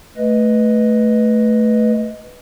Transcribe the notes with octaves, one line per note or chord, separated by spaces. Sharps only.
A3 B4 D#5